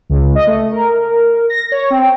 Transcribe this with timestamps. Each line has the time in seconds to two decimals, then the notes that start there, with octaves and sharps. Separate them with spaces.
0.10 C#2
0.35 D#5
0.47 A3
0.72 A#4
1.50 A#6
1.72 C#5
1.90 C4